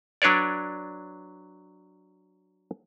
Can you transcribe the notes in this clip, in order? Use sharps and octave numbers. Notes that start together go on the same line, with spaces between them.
F#3 D4 B4 C#5 D5